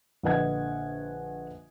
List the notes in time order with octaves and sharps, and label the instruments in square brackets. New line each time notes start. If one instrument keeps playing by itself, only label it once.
[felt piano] A#1 D3 B4 D#5 F#5 G#6